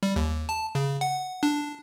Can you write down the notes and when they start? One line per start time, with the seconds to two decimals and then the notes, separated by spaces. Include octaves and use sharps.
0.03 G3
0.16 D#2
0.49 A5
0.75 C#3
1.01 F#5
1.43 D4